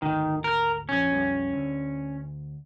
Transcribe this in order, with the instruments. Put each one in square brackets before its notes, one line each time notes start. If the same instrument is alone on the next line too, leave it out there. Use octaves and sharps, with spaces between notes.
[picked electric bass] G#1 D2 [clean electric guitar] D#3
[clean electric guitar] A#4
[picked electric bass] A#1 F2 [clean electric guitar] C#4
[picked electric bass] B1 F2 G3
D2